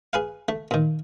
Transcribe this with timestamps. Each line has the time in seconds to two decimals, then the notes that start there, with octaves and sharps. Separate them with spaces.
0.13 G#4 B4 F5
0.48 A3
0.71 A#2 D#3